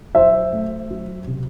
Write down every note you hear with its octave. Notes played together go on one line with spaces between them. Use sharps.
F#3 C5 E5
A3
F#3
C3